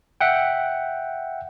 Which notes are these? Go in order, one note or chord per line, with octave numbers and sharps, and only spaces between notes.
E5 F#5 G5